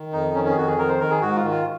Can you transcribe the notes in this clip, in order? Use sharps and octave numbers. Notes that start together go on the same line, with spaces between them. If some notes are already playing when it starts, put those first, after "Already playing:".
Already playing: D#3
F2 D#4
D#3 C#4
C#4
G#4
F2 F#4
G#4
D#3 A#4
C5
D#3 A#4
G#4
G#2 F#4
F4
D#3
F4